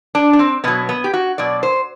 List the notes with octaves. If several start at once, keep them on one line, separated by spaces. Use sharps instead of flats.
D4
D4
C4
B2 F#3 B3
B3
G4
F#4
B2 F#3 D5
C5